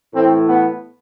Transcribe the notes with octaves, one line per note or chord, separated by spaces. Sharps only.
A2 E3 A3 C4
B3